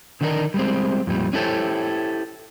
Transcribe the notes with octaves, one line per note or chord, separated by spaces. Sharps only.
D3 D#3 D4 D#4 A4 A#4
G3 G#3 C4
F2 A#2 G3
C#4 E4 G4 A4 C5 C#5